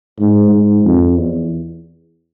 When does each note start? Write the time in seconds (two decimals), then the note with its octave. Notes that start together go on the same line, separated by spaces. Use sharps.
0.20 G#2
0.52 G#2
0.85 F2
1.17 E2